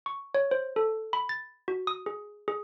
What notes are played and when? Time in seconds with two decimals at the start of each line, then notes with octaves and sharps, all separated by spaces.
0.06 C#6
0.35 C#5
0.51 C5
0.76 A4
1.13 B5
1.29 A6
1.68 F#4
1.87 D#6
2.06 G#4
2.48 G#4